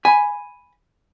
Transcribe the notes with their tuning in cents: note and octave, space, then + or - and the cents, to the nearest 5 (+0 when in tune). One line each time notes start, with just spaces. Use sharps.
G#5 +0 B5 +0